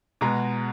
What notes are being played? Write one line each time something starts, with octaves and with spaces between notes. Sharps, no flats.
B2 G#3 B3 A#5